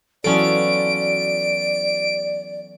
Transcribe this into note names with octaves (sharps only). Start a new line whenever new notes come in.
E3 F#3 B3 C#4 F4 A4 D5 D7